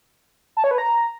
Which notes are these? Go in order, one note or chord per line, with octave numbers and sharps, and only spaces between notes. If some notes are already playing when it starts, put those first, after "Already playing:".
A5
C#5
B4
A#5